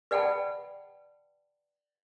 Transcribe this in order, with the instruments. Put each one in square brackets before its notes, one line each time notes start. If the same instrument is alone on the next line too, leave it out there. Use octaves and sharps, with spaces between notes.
[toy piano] B4 D5 F#5 G5 A5 B5